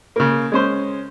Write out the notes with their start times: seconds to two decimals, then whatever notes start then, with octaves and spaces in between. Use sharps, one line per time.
0.16 C#3 A#3
0.52 G#3 C#4 C5